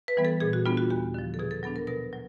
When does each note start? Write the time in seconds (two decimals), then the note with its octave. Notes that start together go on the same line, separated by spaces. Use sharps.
0.08 B4
0.17 E3 G3 B3
0.25 A4
0.40 A#2 G#4
0.53 F#4
0.65 G3 B3 D4 F4
0.78 F#4
0.90 D#2 G4
1.14 D3 F3
1.34 A4
1.39 B2 G#4
1.51 A4
1.63 F#3 B3 D4 A4
1.76 A#4
1.87 B2 A#4
2.13 F#3